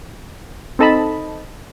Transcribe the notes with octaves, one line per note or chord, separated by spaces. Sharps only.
C4 D#4 A4 D#5 A5 B5